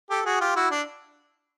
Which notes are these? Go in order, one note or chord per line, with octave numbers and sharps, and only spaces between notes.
G4 A4
F#4 G#4
F4 G4
E4 F#4
D4